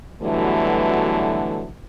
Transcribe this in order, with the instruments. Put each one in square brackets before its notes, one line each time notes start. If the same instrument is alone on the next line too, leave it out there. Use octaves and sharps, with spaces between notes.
[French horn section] B2 D3 E3 F#3 G3 A3